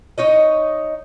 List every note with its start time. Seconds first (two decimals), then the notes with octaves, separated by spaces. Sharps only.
0.18 D#4 C#5 D#5